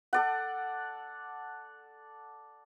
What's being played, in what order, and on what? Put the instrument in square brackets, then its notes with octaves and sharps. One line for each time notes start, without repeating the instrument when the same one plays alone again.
[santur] A4 D5 F#5